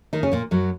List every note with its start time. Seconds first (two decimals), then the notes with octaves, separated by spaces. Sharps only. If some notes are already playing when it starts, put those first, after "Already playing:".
0.13 D#3 D#4
0.23 C#3 C#4
0.32 A#2 A#3
0.51 F#2 F#3